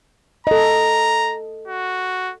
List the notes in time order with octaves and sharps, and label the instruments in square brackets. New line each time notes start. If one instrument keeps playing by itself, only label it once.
[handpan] A4 D#5 [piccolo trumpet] A#5
[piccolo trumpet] F#4